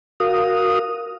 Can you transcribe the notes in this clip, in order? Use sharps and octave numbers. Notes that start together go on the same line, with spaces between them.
F#4 A#4 F5 D#6